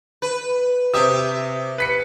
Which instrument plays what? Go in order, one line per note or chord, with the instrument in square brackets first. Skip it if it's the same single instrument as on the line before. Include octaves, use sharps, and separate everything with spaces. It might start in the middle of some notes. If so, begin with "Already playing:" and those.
[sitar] B4
[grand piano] C3 D#6 [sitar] G4 E5
[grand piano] B4 B6 C#7